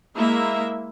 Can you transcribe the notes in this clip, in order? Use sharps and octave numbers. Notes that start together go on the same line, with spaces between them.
G#3 A#3 E4 E5